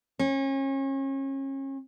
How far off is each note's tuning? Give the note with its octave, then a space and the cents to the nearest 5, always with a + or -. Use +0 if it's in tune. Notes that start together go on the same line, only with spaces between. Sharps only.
C#4 -35